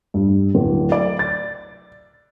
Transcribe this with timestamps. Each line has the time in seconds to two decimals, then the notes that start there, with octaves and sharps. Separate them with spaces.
0.14 G2
0.55 D1
0.92 D5
1.19 A6